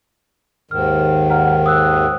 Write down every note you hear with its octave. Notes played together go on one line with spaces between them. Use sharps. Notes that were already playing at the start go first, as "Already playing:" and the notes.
D#2 G#2 D#3 F6
F#5 A#5 F6
D#6 E6 F#6